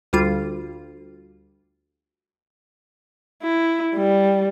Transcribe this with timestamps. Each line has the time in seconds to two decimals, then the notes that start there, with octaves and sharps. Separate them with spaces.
0.13 D2 G3 F4
3.43 E4
3.95 G3